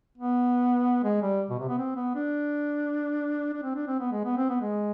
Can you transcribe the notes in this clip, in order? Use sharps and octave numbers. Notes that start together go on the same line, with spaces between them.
B3
G#3
G3
B2
C3
B3
C4
B3
D4
D4
C4
D4
C4
B3
G#3
B3
C4
B3
G#3